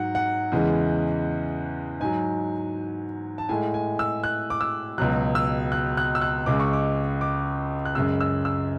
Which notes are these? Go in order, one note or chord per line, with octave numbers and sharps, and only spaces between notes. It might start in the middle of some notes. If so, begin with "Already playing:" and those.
Already playing: G#2 F#3 F#5
F#5
E2 C#3 E3 G#3
G#2 F#3 G#5
A5
A2 G#3 G#5
G#5
E6
F#6
D6
E6
C#2 B2 F#3 F#6
E6
F#6
F#6
E6
F#6
C#2 C#3 G#3 D6
C#6
D6
D6
F#6
F#2 C#3 G#3 E6
E6
E6